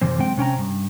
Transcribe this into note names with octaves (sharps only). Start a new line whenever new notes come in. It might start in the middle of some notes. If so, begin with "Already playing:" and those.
F#2 C3 E3 C4
G#3 C4 G5
C3 C#4 G5 A#5
G2